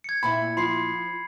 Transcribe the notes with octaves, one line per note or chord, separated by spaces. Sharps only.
G#6 C#7
A#2 C4 E4 B5
F3 B5 C6 C7